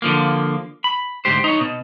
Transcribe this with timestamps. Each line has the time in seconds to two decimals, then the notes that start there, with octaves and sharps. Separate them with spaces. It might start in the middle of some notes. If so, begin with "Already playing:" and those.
0.02 D3 F3 A#3
0.84 B5
1.25 D2 G#2 G4 C5
1.44 D#4 C#5
1.61 B2